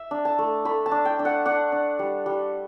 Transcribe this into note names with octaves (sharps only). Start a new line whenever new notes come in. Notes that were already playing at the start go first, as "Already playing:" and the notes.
Already playing: E5
D4
A5
A3
A3 B5
A5
D4
G5
D4
F#5
D4 F#5
D4
G3
G3